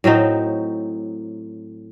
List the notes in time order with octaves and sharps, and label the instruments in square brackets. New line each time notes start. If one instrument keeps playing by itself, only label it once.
[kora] A2 F#3 C4 D#4